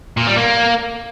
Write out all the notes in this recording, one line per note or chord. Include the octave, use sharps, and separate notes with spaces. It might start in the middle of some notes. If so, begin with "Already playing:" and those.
A#2
G3
A#3